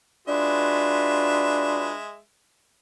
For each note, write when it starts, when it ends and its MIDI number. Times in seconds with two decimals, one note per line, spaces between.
0.28 2.18 56
0.28 2.00 62
0.28 1.93 65
0.28 1.93 66
0.28 1.93 71
0.28 2.18 76